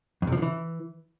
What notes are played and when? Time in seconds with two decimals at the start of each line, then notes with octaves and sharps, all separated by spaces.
0.22 F2
0.27 C3
0.32 F3
0.37 D3
0.42 E3